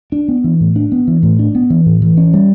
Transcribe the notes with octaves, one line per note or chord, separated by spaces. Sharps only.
D4
B3
E3
A2
D4
B3
E3
A2
D4
B3
E3
A2
E3
C#4
G3